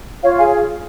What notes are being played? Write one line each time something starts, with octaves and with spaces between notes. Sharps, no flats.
F4 C#5 F5
G#4 F5 G#5